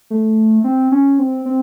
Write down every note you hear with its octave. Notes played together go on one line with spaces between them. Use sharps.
A3
C4
C#4
C4
C4